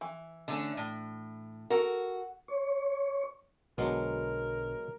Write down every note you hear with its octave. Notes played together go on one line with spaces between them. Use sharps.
E3
D3 A3 C#4
A2
F#4 A4 A#4
C#5
B1 D3 F#3 G#3 B3 A#4